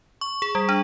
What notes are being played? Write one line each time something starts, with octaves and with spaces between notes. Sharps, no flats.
C#6
G#4
G3
D4